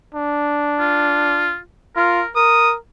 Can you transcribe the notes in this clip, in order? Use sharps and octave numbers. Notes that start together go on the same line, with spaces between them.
D4
F4
F4 A#4
A#4 D#6